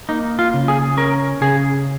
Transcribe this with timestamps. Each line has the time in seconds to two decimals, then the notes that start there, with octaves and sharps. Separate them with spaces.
0.09 A#3 D#4
0.39 F4
0.54 C#3
0.68 G#4
0.97 C#4 A#4
1.41 C#3 G#4